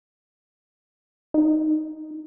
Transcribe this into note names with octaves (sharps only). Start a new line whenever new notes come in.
D#4